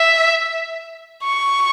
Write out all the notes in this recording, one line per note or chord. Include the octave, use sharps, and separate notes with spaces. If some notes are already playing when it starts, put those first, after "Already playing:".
Already playing: E5
C#6